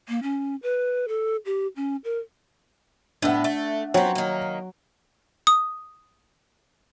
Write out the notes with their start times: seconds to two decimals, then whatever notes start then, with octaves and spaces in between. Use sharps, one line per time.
0.09 A#3
0.23 C#4
0.63 B4
1.08 A4
1.45 G4
1.76 C#4
2.04 A#4
3.22 A2 B3 D4 E5 F#5
3.44 A3
3.94 F#3 B3 C4
4.15 D#3 A#3
5.47 D#6